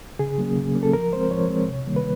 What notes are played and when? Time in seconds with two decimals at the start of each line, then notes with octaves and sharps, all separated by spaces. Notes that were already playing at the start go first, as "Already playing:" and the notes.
0.19 C#3 G#4
0.38 F#3 A#3 C#4
0.56 C#3
0.75 F#3 A#3 C#4
0.83 A4
0.93 F3 A#4
1.13 G#3 C4 C5
1.30 F3 C#5
1.50 G#3 C4
1.68 C3
1.86 D#3 G3 A#3
1.96 B4